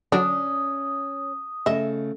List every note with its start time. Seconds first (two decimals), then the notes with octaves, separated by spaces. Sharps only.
0.12 D3 F#3 C#4 D4 D#6
1.66 C#3 A3 D#5 E5